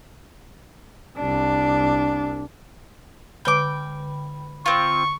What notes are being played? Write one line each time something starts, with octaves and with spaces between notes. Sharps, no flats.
C2 D4
D3 G5 B5 D6
C4 F4 C#6